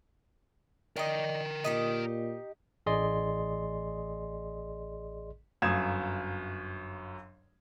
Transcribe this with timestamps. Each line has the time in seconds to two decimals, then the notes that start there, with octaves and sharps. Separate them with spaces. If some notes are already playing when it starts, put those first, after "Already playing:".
0.96 A#4 D5 D#5 G5
1.64 A#2 D#4 G4 D#5
2.86 A1 G#4 D5 D#5 C6
5.62 G1 F#2 F5 D#6 G#6 E7